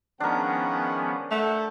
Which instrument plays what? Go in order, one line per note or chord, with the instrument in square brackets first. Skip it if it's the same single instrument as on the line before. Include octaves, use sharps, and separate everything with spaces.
[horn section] D#3 G#3 F#5 [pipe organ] F3 B3 C#4 [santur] D4 A#4
[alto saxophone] A3 [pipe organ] F#5 G6